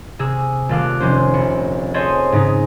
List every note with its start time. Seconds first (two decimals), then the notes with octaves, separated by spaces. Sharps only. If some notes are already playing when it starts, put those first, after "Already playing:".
0.19 C3 G#4 E6
0.69 D#1 A3 A4 F5 D6 F#6
1.00 F1 C3 C#4 C5
1.34 A#1 C#7
1.94 G#4 A4 C5 C#5 D#5
2.32 G#2 C#3 D#4